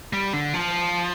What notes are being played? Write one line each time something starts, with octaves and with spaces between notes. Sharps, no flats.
G3
D3
F3